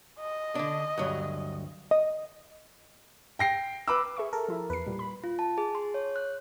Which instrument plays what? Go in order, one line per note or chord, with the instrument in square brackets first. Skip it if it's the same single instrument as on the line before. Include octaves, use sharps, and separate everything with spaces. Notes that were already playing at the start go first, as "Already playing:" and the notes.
[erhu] D#5
[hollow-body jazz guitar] D3 D4
D2 G2 F#3
[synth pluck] D#5
[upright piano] G5 A#6 C7
B4 B5 D6 E6
[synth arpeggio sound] G#4 E5 C#6
[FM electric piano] A4 A#4
[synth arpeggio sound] F3 E4
[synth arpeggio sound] E2 C7 [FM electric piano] B4
[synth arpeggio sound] A#2 G3
B5
[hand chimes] F4
A5
G#4
C6
C#5
F#6